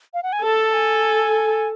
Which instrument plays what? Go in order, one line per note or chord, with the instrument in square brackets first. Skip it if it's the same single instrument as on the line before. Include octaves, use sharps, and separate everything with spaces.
[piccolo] F5
F#5
G#5
[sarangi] A4 [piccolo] A5
[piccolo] G#5